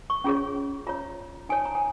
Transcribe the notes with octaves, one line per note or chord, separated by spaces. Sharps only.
C#6
C#4 F4 G#4 C#5
F4 C#5 A#5
D#4 C#5 G#5
A#5
G#5